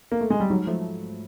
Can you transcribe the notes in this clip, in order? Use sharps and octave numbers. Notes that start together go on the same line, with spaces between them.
A#3
A3
G#3
G3
G#2 F#3
F3 A3